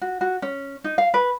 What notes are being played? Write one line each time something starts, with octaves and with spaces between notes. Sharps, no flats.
F#4
F#4
C#4
D#4
F5
B4